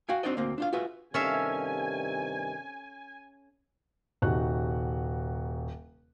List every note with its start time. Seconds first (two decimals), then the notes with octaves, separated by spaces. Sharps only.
0.09 F#4 F5 G5 G#5
0.23 C4 D4 D#4 F#4 D5 D#5
0.37 D2 A#3 C4
0.58 D4 F4 F5
0.73 F4 F#4 G#4 B4 E5
1.14 G2 C3 D#3 C#4 A4 E5 F5 G#5
4.22 D#1 C3 D#4 F#4 F#5 F#6